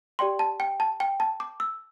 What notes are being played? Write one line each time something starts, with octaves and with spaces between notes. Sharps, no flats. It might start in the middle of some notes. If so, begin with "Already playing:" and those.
G4 D5 G5 C6
A5
G5
A5
G5
A5
D6
E6